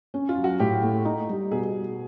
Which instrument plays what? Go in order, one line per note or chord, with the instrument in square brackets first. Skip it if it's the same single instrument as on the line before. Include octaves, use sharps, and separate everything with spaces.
[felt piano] C#4
[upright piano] F4
[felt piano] F#3
[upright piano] F#4
[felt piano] A2 [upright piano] G4
[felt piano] A3
D#4
G3
[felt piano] B2 [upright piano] G#4